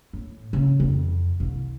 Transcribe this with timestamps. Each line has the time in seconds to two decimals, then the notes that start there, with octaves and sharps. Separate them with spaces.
0.13 A2
0.53 C#3
0.80 F2
1.40 C2